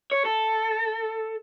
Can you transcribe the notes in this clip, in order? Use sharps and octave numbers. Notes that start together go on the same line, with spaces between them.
C#5
A4